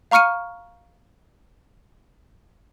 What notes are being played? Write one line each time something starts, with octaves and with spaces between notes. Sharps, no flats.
F5 A#5 C#6 F6 C#7 D#7